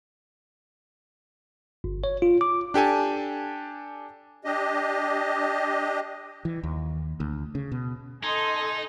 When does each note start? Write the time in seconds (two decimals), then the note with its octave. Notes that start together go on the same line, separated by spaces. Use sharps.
1.84 G1
2.04 C#5
2.22 F4
2.41 D6
2.74 D4 G4 A4 G#5
4.45 D4 G4 D#5
6.45 E3
6.63 D#2
7.20 D2
7.55 C#3
7.72 B2
8.23 D#4 A4 D#5 G#5 C6